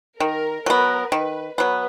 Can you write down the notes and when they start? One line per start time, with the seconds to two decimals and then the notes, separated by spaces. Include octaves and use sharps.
0.20 D#3 A#4
0.66 F#3 B3 A#4
1.12 D#3 B4
1.58 F#3 B3 B4